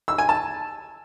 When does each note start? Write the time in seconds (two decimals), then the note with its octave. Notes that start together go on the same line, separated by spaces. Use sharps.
0.08 E6
0.18 G#5
0.29 A5